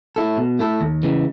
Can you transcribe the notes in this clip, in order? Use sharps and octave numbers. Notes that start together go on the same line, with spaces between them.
A3 E4 A4
B2
A3 E4 A4
D#2
C#3 E3 G#3